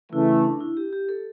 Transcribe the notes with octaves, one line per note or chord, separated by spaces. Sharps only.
C#3 E3 A3 E4
E4
D4
E4
G4
G4
A4